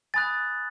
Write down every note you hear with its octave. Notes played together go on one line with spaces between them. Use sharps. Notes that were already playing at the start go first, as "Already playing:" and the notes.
G#5 B5 D#6 F#6 A6